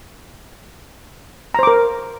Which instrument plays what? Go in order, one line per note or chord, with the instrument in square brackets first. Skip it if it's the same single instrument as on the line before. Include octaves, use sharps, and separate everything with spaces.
[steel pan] A#5
C5
D6
A#4